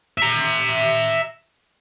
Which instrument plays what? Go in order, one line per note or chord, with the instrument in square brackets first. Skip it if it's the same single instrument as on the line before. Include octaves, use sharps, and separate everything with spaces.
[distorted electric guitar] E5 A#5